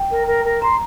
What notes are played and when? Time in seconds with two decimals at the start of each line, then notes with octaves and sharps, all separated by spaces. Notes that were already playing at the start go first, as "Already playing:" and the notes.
Already playing: G5
0.11 A#4
0.27 A#4
0.45 A#4
0.62 A#5 C6